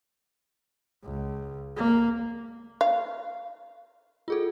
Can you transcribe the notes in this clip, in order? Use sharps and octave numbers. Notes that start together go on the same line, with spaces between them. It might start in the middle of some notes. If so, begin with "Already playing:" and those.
C#2
A#3
F5
F4 G#4 A4